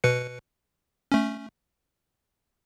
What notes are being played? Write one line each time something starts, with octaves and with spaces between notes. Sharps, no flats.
B2 B4 C#7
A3 C#4